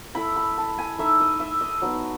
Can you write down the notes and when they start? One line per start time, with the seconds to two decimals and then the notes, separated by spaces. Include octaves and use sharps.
0.15 A3 E4 B5
0.36 B5
0.58 A5
0.78 G#5
0.99 A3 D#4 E5
1.20 D#5
1.40 E5
1.61 D#5
1.82 F#3 B3 D#4